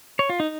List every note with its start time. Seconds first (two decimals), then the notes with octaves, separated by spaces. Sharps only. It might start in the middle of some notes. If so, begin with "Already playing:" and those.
0.19 C#5
0.29 F4
0.40 D#4